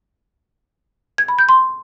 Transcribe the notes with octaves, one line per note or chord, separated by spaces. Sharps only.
G#6
B5
G6
C6